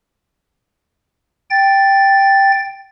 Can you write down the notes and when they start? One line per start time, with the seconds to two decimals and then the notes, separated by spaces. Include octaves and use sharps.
1.50 G5 A6